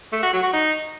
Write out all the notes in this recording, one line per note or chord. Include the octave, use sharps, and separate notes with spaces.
A3
F#4
F#3
F#4
D#4